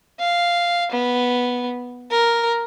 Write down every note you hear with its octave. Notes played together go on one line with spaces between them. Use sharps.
F5
B3
A#4